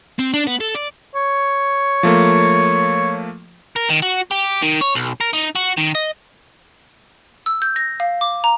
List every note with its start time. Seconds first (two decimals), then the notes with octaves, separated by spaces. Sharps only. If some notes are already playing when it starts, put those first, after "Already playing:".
0.19 C4
0.34 D4
0.47 B3
0.60 A4
0.75 D5
1.15 C#5
2.03 F3 A3 A#3
3.76 A#4
3.90 D#3
4.02 F#4
4.31 G4
4.62 D#3
4.81 C#5
4.96 B1
5.21 A#4
5.33 D#4
5.56 F#4
5.77 D#3
5.95 D#5
7.46 E6
7.62 G6
7.76 A#6
8.00 F5
8.21 D6
8.44 A#5